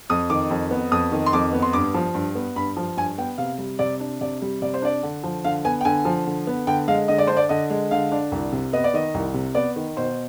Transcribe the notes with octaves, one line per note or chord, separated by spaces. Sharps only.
F2 D#6
D#3 D6
F2
B3
F2 D#6
D#3
C6
F2 D6
B3
C6
G2 D6
F3
G2
B3
G2 B5
F3
G2 G#5
B3 G5
C3 F5
G3
C3 D5
D4
C3 D5
G3
C3 D5
C5
D4 D5
D3
F3
D3 F5
B3 G#5
G5
D3 G#5
F3
D3
B3
D3 G5
G#3 F5
D3 D#5
D5
D4 C5
D5
D3 D#5
G#3
D3 F5
D4
C2
C3
B3 D#5
D5
D#3 D#5
C2
C3
B3 D5
D#3
B2 C5